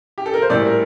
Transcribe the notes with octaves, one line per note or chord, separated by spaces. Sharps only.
G4
A4
A#4
C5
A#1 A2 G3 A#3 D5
A#4